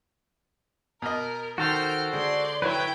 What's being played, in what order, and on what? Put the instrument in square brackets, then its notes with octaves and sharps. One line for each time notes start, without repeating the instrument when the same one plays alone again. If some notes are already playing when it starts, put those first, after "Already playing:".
[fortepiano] B2 D#5 [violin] A#4 [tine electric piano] A#5 F6
[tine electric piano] D#3 [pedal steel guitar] F#4 A4 C5 [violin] G5 F6
[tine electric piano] D3 [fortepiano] G#3 [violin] D5 C6
[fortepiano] F#3 [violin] E4 G5 [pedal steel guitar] B4 C#5